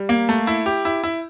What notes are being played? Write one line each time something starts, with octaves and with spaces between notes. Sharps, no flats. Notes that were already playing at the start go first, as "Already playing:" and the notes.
Already playing: G3
A#3
A3
E4
G4
E4
E4